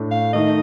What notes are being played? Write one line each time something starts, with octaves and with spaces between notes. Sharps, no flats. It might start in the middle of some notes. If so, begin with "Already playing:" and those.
Already playing: A2 A3 D4
F5
D#3 A3 D#4 D#5